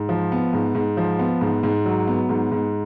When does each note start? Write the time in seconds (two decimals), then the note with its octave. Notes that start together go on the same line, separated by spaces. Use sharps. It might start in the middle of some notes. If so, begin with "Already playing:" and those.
Already playing: G#2
0.09 F3
0.32 B3
0.53 G#2
0.75 G#2
0.97 F3
1.19 B3
1.41 G#2
1.63 G#2
1.85 F#3
2.07 B3
2.29 G#2
2.52 G#2